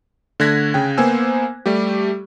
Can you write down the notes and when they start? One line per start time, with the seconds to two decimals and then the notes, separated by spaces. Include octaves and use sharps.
0.40 D3 A3 F#6 G#6 A#6 B6
0.74 C#3 G5
0.98 A#3 B3 C5 G#5 E6
1.66 G3 A3 G4